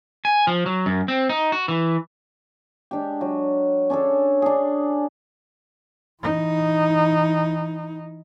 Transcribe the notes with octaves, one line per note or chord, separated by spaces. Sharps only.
G#5
F3
F#3
F#2
C4
D#4
F#4
E3
G#3 D4 G4
F#3
C#4 D4 G#4 A4
D4 G#4
E3 D#4